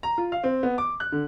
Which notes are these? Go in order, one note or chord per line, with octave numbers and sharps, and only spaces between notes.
A#5
F4
F5
C4
B3
D6
F#6
D3